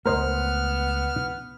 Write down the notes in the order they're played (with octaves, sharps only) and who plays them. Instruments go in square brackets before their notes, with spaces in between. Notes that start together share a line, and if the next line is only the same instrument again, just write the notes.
[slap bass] C#2 A3 [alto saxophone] B3 [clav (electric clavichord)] A#4 C5 D#5 [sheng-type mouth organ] F6